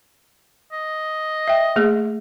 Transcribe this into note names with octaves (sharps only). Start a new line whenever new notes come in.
D#5
E5 G5
A3 A#3 G#4